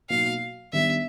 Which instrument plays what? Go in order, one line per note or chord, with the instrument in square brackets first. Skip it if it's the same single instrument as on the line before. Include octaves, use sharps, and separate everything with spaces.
[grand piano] B2 F#3 A#3 D#4 [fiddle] F5
[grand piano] D#3 G3 B3 D4 [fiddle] E5